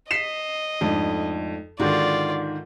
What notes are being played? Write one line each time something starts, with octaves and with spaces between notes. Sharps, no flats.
D#5 B6 C7 E7
F2 G#2 A3 D4
G#2 D3 D#3 F4 F#4 D5